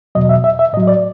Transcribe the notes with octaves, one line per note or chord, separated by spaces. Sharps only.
E2 B2 F#3 D#5
E5
E5
E5
A2 F#3 D#5
D5